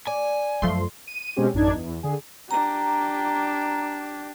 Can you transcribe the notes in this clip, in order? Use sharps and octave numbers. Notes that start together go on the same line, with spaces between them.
D5 G#5
F#2 F3 A3 C6
D#7
B2 G#3 C4 C#4 G4
A1 F#2 D4 D#4 G#6
E2
D3 G#4
D4 G4 A#5